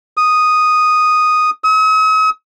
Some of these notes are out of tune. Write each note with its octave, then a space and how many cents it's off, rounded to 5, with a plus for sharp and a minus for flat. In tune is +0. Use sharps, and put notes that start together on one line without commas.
D#6 -5
D#6 +45